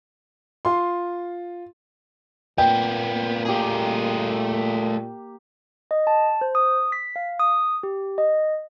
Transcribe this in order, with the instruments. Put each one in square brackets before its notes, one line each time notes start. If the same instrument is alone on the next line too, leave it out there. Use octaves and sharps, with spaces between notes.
[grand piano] F4 C6
[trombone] A#2 [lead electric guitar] A#3 B3 [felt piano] G5
[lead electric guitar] A3 G#4 [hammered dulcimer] A#3 G4
[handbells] D#5
A5
C5
D#6
B6
F5
D#6
G4
D#5